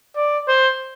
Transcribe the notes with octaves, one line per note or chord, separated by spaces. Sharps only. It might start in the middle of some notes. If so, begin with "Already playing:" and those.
D5
C5